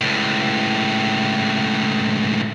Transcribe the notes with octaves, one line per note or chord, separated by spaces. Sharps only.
C#2 A2